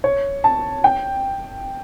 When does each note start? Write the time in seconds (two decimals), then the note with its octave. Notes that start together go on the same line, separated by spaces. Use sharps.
0.04 C#5
0.44 A5
0.84 G5